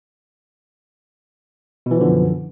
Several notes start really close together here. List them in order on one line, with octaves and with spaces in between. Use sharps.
B2 E3 F3 D3 F#2